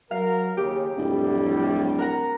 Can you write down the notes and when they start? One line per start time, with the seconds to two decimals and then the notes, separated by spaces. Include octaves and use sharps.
0.11 F#3 A#4 F5
0.57 D#2 C#3 G4
0.97 D1 F2 A2 G3
1.99 A#4 F#5 A#5